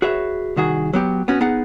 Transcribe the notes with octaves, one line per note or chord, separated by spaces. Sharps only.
F#4 G#4 B4 C#5 E5
C2 D#3 F#4 G#4
F#3 B3 G4
B3 C#4 F#4
B3 D#4 G#4 F#5